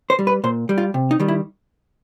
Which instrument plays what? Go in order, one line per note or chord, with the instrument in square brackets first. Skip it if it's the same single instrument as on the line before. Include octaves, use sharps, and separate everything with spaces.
[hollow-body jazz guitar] C5
G3
B4
A#2 C5
G3
F4
C3
D#4
D#3 G3
E4